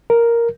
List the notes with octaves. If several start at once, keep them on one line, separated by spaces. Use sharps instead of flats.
A#4